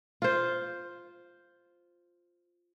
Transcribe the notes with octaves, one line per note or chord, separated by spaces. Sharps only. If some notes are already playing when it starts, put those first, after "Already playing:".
F4 C5